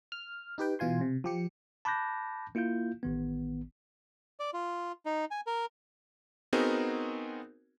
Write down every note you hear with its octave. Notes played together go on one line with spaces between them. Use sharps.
F6
D#4 G4 B4 G5
B2 E3 F4 G#5 C6
C3
F3 G4 C#7
A5 B5 D6 F#6 G6 A#6
A#3 E4 F4 F5 G6
A1 D#3 B3
D5
F4
D#4
G#5
A#4
B3 C4 D#4 F#4 G#4 A#4